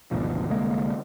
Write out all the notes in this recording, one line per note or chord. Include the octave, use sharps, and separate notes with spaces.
G#1 D2 B2 F3
C2 D3 G#3 A#3